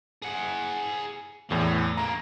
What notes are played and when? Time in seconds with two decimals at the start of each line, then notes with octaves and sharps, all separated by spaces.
0.22 G#4 F#5
1.51 E2 A2 E3
1.97 C#3 A#3 A#5